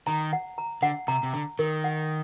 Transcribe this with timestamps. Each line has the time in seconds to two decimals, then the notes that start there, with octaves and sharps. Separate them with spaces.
0.07 D#3 A#5
0.33 F#5
0.58 A#5
0.82 D3 F#5
1.08 C3 A#5
1.23 C3
1.33 D3 A#5
1.59 D#3 A#4
1.84 F#5